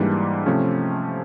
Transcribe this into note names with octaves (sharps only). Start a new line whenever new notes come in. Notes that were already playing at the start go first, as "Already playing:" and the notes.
Already playing: G#2 E3 G3 A#3 D4
C3 F3 A3 C#4